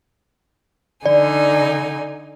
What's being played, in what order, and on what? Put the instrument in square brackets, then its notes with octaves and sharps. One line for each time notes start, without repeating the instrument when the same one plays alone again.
[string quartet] D3 D#4 G#5 [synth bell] D5